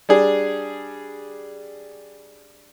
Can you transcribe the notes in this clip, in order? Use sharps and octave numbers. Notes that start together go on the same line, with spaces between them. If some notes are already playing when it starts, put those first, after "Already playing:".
G3 D4 G#4